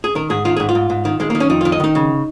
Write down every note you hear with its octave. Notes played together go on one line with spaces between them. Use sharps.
G#4
D#3 A#4
G#2 G#4
D#3 F4
G#2 G#4
F4
G#2
G#2
D#3
D#3 G#3
D#3 A#3
C#4
F2 D#4
D#3 F4
D#5
D#3 D#4
C#3